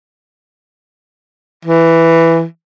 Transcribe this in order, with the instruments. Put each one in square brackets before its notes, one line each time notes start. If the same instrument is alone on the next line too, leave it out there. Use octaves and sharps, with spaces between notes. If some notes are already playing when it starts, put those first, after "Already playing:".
[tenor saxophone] E3